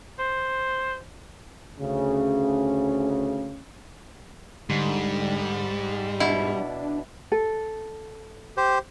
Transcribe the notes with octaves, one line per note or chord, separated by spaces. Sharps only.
C5
D2 C#3
G#2 D3 G3
B2 D4 E4
A4
G4 C5